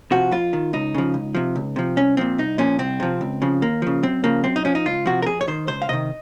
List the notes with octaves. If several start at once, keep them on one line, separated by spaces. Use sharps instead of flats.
C3 F3 F#4
F2 F4
D#3
C#2 D#4
C#3 F3
C#2
C3 F3
C#2
C3 F3
C2 C#4
A#2 F3 C4
C2 D#4
A#2 F3 C#4
C2 C4
C3 F3
C#2
C#3 F3
D#2 A#3
C#3 F3
F#2 C4
C#3 F3 A#3
F#2 C4
D#4
F3 C#4
D#4
C#2 F4
C3 F3 F#4
A#4
F2 G#4
C#5
D#3 C5
C#2 C5
F5
C3 D#3 D#5